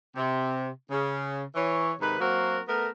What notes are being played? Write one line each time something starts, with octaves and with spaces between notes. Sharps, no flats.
C3
C#3
E3 C#5
G#2 C3 D#3 B4
F#3 A#3 C4 F#4 A#4
A3 B3 A#4